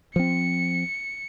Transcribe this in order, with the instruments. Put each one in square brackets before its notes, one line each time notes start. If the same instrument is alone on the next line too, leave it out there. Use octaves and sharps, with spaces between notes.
[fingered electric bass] F3 C4 [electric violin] C#7